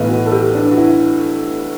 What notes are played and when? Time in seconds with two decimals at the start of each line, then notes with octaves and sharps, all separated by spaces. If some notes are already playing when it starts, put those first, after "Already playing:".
Already playing: B1 A2 E3 B4
0.09 F#4
0.26 A4
0.32 G4
0.55 D4
0.71 F#4
0.77 E4